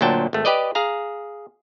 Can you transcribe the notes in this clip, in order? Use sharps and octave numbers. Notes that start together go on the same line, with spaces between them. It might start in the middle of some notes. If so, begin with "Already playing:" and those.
D2 A#2 F#3 G5 A5
G#1 A3
G4 B4 D5 D#5
G#4 F5 A#5